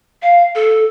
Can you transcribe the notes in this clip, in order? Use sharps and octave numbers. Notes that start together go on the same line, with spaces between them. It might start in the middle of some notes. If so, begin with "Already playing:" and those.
F5
A4